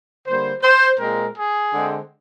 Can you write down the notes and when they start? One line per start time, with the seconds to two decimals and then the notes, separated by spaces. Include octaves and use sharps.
0.26 D3 G3 A#3 C5
0.63 C5
1.00 A#2 G#3 C4 A#4
1.36 G#4
1.73 D3 G#3 C4